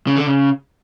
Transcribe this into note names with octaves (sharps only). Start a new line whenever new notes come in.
C#3
D3
C#3